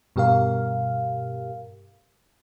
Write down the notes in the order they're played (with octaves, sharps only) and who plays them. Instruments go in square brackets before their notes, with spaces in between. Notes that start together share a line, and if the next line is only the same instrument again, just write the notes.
[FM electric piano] G2 B2 G4 A#4 F5